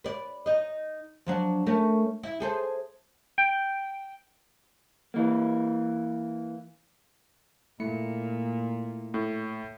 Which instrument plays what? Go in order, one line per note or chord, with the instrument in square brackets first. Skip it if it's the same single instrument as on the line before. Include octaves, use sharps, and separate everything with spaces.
[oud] B4 D5
D#4 D#5
F3 F#3 D4
A3 C#4 A#4
E4
G#4 A4 C5
[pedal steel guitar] G5
[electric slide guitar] E3 A#3
[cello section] A#2 [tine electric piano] A3 E4 C#7
[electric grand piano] A2